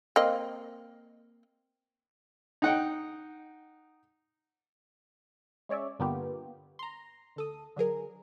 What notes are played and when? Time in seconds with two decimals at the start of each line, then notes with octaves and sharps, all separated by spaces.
0.16 A#3 C4 D#5
2.62 D#4 F#5 G5
5.69 G#3 C#4 C#5 D5 E5
5.99 G2 D3 A#3 B3 F4 G4
6.79 A#5 C6
7.36 D2 A4 D#6
7.76 D3 F#3 G#4 A#4